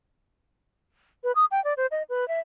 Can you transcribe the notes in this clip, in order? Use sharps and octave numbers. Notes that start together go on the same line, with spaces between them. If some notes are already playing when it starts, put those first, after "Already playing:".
B4
D#6
G5
D5
C5
D#5
B4
E5